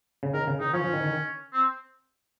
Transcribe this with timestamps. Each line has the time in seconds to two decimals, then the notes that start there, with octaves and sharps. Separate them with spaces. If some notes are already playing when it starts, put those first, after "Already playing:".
0.23 C#3
0.34 D#3 A#4
0.47 C#3
0.60 D#3 D#4
0.73 F3 C#4
0.84 F3
0.93 D#3
1.03 D#3
1.53 C4